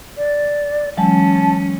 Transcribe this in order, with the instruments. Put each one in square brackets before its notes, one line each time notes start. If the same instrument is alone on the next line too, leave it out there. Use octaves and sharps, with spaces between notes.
[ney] D5
[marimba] E3 F#3 G#3 [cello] C#4 [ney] A5